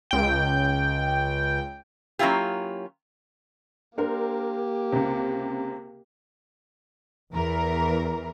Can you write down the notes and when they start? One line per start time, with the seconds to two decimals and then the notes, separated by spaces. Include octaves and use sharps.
0.11 C#2 G5
2.19 F#3 A#3 C#4 E4 F4 G4
3.98 A#3 D4 G4 A#4 C5
4.92 C#2 C3
7.33 E2 E3 A#4